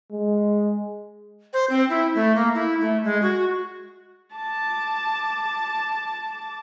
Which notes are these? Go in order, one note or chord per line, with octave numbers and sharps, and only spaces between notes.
G#3
C5
C4
E4
A3
A#3
E4
A3
G#3
F#4
A5 D6